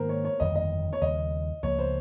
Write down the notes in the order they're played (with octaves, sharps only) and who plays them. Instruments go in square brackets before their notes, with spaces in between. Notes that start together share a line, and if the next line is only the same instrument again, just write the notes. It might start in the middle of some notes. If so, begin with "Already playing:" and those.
Already playing: [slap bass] G#2 D#3 A#3 [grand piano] A#4 C5
[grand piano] C#5
C#5
[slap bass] G1 F2 D#3 G3 [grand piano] D#5
[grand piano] D#5
C#5
[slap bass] D#2 C#3 G3 [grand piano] D#5
[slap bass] C#2 C#3 F3 A#3 [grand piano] C#5
[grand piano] C5